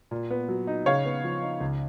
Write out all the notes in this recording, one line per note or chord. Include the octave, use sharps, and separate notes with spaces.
A#2
B3
F#3
D#4
C#3 C#5 F5
B3
F3
D#4
C#2